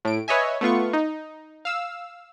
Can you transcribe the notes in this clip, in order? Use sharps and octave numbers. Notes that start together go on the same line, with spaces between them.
A2 D7
B4 C#5 D#5 E5 G#5
A3 B3 F4 C#6
D#4
F5 E6